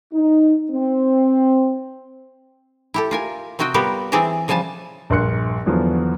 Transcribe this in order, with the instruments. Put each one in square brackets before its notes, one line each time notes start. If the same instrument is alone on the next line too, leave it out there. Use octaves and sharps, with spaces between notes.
[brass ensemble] D#4
C4
[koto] E4 G4 A4
F4 A#4 G#5
C3 C4 F#4 D#5 G5
G3 B3 F4 G4 A#4
E3 C4 G#4 D5 E5 A#5
C#3 F3 G3 G#5 A5
[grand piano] A#1 G2 A#4 C6 F#6 C#7
E2 D3 F3 F#3 B3